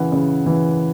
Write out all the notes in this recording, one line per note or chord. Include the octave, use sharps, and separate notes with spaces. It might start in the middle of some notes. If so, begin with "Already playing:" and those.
Already playing: C#3 E3 F#5
C#3
E3